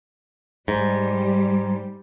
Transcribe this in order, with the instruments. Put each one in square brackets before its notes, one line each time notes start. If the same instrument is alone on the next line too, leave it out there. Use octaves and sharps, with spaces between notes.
[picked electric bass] G#2 [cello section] G3